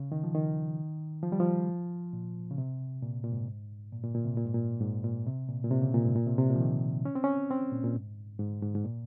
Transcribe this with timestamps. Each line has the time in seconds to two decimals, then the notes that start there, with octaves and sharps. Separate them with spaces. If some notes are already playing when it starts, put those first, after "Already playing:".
Already playing: C#3
0.12 D#3
0.24 F3
0.35 D#3
1.23 F3
1.32 G3
1.40 F3
2.13 A#2
2.51 C#3
2.58 C3
3.03 A#2
3.24 A#2
3.32 G#2
3.92 A#2
4.04 A#2
4.15 A#2
4.25 C3
4.37 A#2
4.46 G#2
4.54 A#2
4.81 G#2
5.04 A#2
5.26 C3
5.49 A#2
5.64 A#2
5.71 C3
5.82 C#3
5.94 A#2
6.05 G#2
6.16 A#2
6.26 C3
6.38 C3
6.50 A#2
6.55 F3
6.60 D#3
7.05 C#4
7.15 C4
7.24 C#4
7.51 C4
7.72 A#2
7.84 A#2
7.96 G#2
8.39 G#2
8.62 G#2
8.75 G#2
8.84 A#2